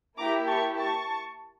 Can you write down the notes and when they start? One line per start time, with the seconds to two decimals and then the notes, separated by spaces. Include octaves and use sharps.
0.18 A#3 E4 G4 A#5 D6
0.48 A5 C#6
0.77 A5 C#6